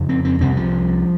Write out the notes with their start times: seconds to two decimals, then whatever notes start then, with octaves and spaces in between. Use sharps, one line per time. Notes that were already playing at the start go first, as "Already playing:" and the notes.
Already playing: F2 C#3
0.09 C4
0.25 C4
0.40 C2 C3 C4
0.57 F3